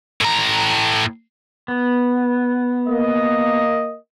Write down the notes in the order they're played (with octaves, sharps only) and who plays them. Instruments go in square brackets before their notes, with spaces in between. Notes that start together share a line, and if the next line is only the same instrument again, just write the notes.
[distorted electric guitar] A2 A#5
[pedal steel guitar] B3
[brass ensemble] A#3 D#5